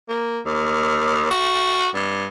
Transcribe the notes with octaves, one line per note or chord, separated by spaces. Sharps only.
A#3
D#2
F#4
G2